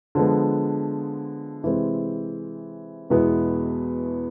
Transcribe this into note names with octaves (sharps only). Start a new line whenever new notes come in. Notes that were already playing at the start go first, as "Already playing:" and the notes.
D3 F3 G#3 B3
C3 E3 G#3 C4
E2 B2 G#3 B3 E4